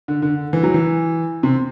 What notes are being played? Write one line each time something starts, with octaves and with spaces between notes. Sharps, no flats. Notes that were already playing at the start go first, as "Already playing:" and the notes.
D3
D3
E3
F#3
E3
C3